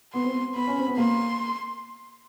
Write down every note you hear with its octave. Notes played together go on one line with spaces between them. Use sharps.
B3 C6
C4
B3
B3 B5
C#4
C4
B3
A#3 C6